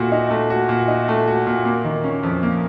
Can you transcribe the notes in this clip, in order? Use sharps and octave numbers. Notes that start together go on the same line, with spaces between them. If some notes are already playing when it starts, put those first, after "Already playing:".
Already playing: A#2 A3 F#4
D#4
A3
F#4
A#2
D#4
A3
F#4
A#2
A#3
D#3
C#4
F2
A#3